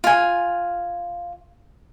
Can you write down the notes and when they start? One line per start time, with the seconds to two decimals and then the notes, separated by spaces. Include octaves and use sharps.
0.04 F4 G#5